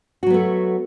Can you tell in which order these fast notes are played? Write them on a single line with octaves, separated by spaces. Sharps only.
F#4 F#3 B3 A3